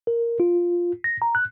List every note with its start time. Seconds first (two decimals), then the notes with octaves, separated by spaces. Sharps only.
0.07 A#4
0.40 F4
1.04 A#6
1.22 A#5
1.35 F#6